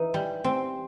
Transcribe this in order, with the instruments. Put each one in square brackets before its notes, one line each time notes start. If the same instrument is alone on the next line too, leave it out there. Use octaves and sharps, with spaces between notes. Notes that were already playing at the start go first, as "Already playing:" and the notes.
Already playing: [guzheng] E3 D#4
G3
C4